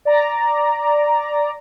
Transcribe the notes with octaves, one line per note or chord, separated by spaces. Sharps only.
D5 A#5